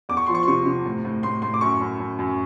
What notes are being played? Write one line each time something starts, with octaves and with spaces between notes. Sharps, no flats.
E2 D6
C#6
F3 C6
C#6
C6
C3 C#6
C3
A2
A2
A2 C6
A2 C6
D6
F#2 C#6
F#2
F#2
F#2